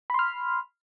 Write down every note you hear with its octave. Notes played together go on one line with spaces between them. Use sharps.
B5 C6 F6